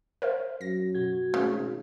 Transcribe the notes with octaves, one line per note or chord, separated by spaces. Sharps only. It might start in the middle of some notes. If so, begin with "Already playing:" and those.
A#4 C5 E5
F#2 A#6
B2 F#4 G#6
G#1 C#3 A3